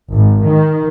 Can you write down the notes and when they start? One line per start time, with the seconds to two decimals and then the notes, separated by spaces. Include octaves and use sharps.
0.12 G#1
0.46 D#3